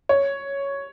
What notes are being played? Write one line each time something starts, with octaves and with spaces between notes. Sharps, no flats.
C#5